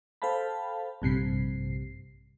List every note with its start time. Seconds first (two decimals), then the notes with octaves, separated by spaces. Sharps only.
0.22 A4 C5 F5 G5 A5 B5
1.02 A#1 G2 C3 C7